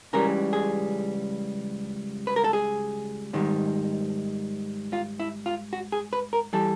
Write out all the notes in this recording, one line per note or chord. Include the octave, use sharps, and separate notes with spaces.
C#2 C#3 E3 G3 A#4
G#4
B4
A#4
A4
G#4
G#2 D#3 G3
F4
E4
F4
F#4
G#4
B4
A#4
E3 G3 A4